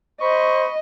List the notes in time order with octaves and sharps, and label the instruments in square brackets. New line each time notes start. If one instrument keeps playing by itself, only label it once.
[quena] C5 [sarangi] D#5 [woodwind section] B5 C#6